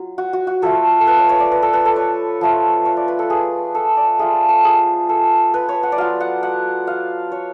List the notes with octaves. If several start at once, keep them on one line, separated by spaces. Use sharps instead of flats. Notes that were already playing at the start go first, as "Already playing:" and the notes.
Already playing: F#3 F4
F#4
F#4
F#4
F3 A3 F4 A4
A4
B4
C#5
C#5
D5
B4
A4
B4
A4
C#5
F3 A3 F4
C#5
D5
B4
A4
G#4
A4
D5
A3 F4 G#4
A4
A4
G#4
A4
B4
C#5
F#5
D5
F#3 B3 F4 F5
F#5
F#5
F5
C#5